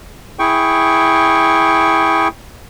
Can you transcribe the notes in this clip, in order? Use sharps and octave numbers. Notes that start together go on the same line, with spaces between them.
E4 G#4 G5 C#6